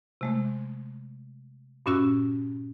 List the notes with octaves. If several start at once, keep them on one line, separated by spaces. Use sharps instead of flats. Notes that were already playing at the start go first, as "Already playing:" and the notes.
C3 G#3 A3
G2 A#2 C#4 F#4 E6